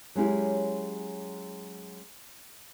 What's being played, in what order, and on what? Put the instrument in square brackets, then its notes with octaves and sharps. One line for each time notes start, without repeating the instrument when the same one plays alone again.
[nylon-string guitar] F#3 G#3 C#4 E4 G4